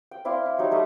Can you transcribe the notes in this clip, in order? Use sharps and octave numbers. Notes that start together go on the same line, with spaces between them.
G5
C4 E4 D5 F5
E4
F#3 G3 D#4
G3 A3 D#5 E5